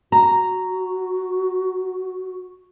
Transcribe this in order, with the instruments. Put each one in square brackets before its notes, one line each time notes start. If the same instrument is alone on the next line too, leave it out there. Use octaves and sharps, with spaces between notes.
[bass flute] F#4 [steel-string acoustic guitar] A#5